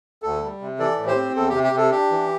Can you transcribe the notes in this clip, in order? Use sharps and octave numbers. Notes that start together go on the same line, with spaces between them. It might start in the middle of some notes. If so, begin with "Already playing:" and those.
D2 A4
G3
C3
E3 A4 D5
A2
G4 C5
C4
E2 A4
C3 G4
G4
C3 A4
D4 G4
E3